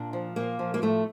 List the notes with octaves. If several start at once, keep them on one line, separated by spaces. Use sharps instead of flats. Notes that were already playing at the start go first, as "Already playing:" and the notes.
Already playing: A#2 D4
F3
A#2 A#3
F3
A#3
A2 A3